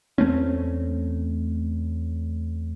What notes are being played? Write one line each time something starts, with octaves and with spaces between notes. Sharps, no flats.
E2 A3 C4 C#4